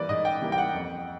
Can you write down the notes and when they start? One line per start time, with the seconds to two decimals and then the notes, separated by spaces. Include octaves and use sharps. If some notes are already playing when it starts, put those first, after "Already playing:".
Already playing: E3 G3 A#3 B4 D5
0.09 G#2 D#5
0.25 G5
0.42 E3 G3 A#3
0.52 G5
0.58 F#5
0.74 F2